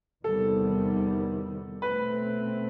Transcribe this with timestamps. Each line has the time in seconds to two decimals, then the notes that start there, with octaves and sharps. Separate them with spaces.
0.24 E2 C3 D#3 G3 B3 A4
1.82 B2 A3 C4 B4